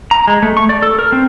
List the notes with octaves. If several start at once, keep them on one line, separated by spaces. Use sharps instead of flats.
A#5
G#3
A3
C#6
D5
A4
A#4
C4